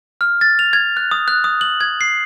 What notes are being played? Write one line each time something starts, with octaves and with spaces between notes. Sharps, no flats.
F6
A6
F7
G#6
F#6
D#6
F#6
D#6
F#7
G#6
C7